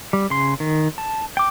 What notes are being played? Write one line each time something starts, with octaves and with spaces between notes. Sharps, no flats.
G3
C#3 C6
D#3
A5
G5 D6